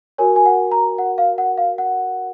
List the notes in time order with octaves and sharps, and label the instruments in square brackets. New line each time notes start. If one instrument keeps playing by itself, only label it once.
[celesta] F#4 A#4 C#5 G#5
G#5
F#5
A#5
F#5
F5
F#5
F5
F#5